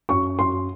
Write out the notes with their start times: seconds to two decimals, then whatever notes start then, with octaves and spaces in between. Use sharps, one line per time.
0.09 F#2 C#6
0.39 F#2 C6